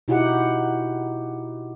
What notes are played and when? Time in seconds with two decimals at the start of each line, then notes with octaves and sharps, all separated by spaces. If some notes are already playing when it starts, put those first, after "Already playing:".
0.08 B2 D#4 E4 F#4 G4 F#5